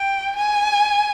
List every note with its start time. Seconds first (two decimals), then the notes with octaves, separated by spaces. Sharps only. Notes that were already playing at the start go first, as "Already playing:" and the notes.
Already playing: G5
0.36 G#5